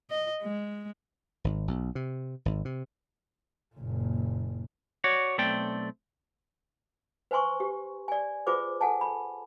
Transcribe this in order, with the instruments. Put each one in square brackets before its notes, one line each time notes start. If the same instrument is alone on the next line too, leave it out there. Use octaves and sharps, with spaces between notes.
[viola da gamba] D#5
G#3
[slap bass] G#1
B1
C3
G#1
C3
[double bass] F#1 A#2
[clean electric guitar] F#4 C#5 D5
B1 A3 C4 D5 G5
[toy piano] B4 C5 G#5 C6 C#6
G4
D5 G#5
F4 G#4 B4 C5 D6
A4 F#5 G#5 A5
B5